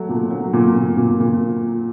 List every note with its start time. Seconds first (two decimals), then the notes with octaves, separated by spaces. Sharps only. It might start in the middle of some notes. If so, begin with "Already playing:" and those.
Already playing: F#3 A3
0.09 A#2
0.31 F#3
0.53 A#2
0.76 A#2
0.97 A#2
1.20 A#2